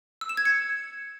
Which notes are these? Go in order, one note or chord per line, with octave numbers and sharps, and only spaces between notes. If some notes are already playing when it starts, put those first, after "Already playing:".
E6
E7
G#6
C#7